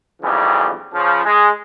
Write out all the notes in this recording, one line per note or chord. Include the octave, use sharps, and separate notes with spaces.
B1 F2 C#3 E3 G3
C#3 F3
G#3